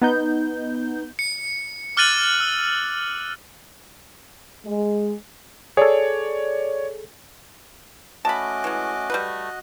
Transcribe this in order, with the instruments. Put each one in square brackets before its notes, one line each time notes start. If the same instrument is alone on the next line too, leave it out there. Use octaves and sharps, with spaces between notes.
[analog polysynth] B3 D#4 G6
[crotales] C#7
D6 F6 F#6 A6 D#7 F#7
E6
[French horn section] G#3
[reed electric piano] G#4 A4 [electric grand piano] C#5 D5
[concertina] A3 C#4 D6 [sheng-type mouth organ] F#4 D#5 [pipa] A5 B5
[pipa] E3 G#3
G3 A3 B4